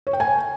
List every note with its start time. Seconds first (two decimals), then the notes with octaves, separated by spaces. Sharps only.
0.07 C#5
0.13 G5
0.20 G#5